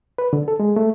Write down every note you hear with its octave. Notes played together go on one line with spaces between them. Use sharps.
B4
D3
A4
G#3
A3